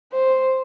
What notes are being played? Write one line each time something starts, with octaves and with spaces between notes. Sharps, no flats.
C5